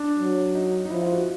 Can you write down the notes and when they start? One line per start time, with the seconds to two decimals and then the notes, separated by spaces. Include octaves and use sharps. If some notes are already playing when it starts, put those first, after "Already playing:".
Already playing: D4
0.19 F#3
0.55 D#4
0.85 D#4
0.90 F3 E4
1.02 F4
1.13 F#4